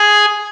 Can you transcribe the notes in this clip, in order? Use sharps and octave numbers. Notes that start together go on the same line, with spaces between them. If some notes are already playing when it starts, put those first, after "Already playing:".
Already playing: G#4 G#5